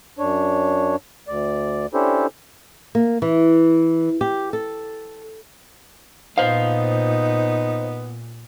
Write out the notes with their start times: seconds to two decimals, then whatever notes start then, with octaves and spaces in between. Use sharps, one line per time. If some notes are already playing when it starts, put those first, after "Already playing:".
0.19 F#2 D4 C#5
1.28 D2 D5
1.94 C#4 D4 E4 G4 A4 C5
2.95 A#3
3.22 E3
4.21 G4
4.53 A4
6.38 A#2 B3 D#4 C5 F5